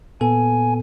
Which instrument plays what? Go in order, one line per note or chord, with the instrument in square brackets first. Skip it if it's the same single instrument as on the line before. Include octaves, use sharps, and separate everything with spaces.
[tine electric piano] A#2 B3 A4 [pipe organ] G#5